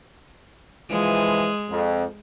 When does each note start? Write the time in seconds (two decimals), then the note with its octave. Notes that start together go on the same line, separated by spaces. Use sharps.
0.91 E3 F3 G#3
1.70 F2